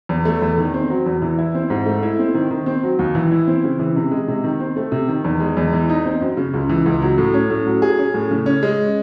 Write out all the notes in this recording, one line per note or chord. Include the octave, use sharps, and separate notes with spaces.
E2
A3
E2
D#3
C4
F#3
E2
E3
E4
C4
G#2
A3
E4
C4
D#3
D#3
C4
F#3
D#2
E3
E4
C4
C#3
E3
C3
G#3
C3
D#3
C4
A3
C3
D#3
E2
G#3
E2
E3
D#4
C4
F#2
C#3
C#2
E3
C#2
F#3
A2
C#4
A2
F#3
G#4
C#4
A2
C#3
C#4
G#3